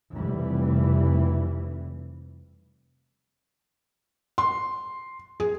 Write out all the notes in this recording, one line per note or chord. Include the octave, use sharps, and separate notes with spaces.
F1 E3 G3
C6
G#4